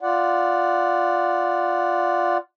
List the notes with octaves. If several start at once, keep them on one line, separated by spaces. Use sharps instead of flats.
F4 D5 F#5